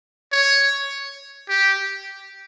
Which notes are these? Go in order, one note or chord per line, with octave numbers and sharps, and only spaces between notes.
C#5
G4